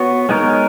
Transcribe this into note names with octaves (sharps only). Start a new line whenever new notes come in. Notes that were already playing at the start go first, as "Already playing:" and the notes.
Already playing: B3 F#4 C#5
G#3 B3 D#4 A#4 C#5